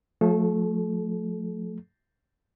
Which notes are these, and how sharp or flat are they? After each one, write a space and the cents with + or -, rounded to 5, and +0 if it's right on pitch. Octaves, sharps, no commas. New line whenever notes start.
F3 +35 A3 +0 A4 -35